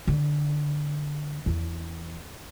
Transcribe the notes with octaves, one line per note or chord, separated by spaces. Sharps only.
D3
E2